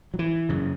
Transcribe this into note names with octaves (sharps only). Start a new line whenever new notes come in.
F#3
E3
F#2 C#3